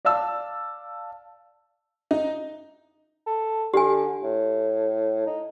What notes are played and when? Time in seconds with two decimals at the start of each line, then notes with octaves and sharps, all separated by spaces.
0.05 D5 F5 A5 E6
2.11 D#4
3.27 A4
3.74 D3 G4 G#5
4.23 A2
5.27 D#4